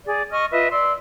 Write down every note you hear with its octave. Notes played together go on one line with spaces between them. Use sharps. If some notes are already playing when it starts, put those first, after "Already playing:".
G#4 D5
D#5 C#6 F6
F4 B4 D#5 E5
D5 C6 E6